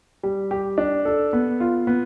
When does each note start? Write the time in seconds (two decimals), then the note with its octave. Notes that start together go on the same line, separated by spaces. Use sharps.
0.23 G3
0.51 G4
0.78 D4
1.05 A4
1.33 B3
1.60 F4
1.87 B3